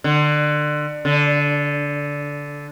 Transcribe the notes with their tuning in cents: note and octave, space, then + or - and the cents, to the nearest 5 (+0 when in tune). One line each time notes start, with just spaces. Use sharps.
D3 +25
D3 -15